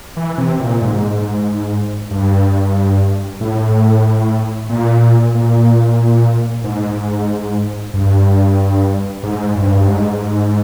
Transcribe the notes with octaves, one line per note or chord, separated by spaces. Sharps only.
E3
C3
A#2
G#2
G2
A2
A#2
A#2
G#2
G2
G#2
G2
G2
G#2